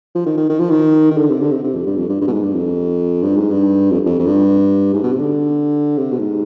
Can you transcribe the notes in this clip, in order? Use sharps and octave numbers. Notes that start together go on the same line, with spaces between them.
F3
D#3
D#3
D#3
F3
D#3
D#3
D3
C3
D3
C3
C3
F2
G2
F2
G2
G2
B2
G#2
G2
F2
G2
G#2
G2
F2
F2
F2
G2
G#2
B2
C3
D3
C3
B2
G#2